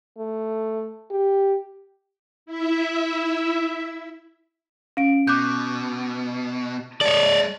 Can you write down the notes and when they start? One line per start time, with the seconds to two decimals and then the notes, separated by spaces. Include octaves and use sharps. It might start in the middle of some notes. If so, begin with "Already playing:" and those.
0.18 A3
1.11 G4
2.46 E4 E5
4.97 C#4 F5 D7
5.27 B2 D6 F#6 G6
7.01 G#3 A4 C#5 D5